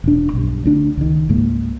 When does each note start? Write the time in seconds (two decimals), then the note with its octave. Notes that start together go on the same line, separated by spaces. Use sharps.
0.04 E1 D4
0.33 B1 G2
0.66 D2 D4
0.97 C#2 D#3
1.29 C#2 G#2 A#3